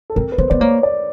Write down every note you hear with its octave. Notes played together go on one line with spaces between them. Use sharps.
A4
C4 A#4
B4
B3 C5
B3 D5
A#3 C#5
D5